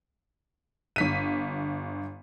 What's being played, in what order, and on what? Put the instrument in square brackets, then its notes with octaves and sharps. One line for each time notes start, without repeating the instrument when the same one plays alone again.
[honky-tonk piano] G1 B6 D#7